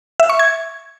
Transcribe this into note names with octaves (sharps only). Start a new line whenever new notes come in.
E5
C#6
G#6